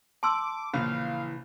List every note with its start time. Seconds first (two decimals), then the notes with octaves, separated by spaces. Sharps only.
0.23 A5 C6 D6 E6
0.74 A#1 C#3 E3 F5